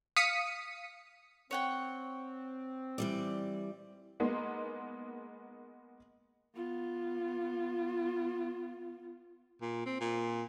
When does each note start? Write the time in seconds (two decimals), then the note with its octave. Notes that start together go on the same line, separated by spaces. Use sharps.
0.16 F5 D#6 B6 C#7 D#7
1.51 C4 C#5 F#5 G5
2.98 E3 G3 D5
4.20 G#3 A#3 B3 D#4 C6
6.55 B3 F4
9.61 A#2
9.86 C4
10.00 A#2